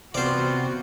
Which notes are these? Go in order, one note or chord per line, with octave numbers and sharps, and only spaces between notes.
C3 B3 F4 F#4 C5 D5